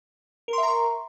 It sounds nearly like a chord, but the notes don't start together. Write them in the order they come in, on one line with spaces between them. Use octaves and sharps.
A#4 C6 E5 A#5 C#6